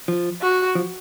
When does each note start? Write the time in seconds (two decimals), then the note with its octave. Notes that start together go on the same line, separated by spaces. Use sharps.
0.08 F3
0.41 F#4
0.75 F3